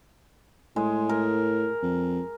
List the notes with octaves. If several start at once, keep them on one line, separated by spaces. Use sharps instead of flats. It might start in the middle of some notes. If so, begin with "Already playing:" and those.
A2 G#3
A#4
F2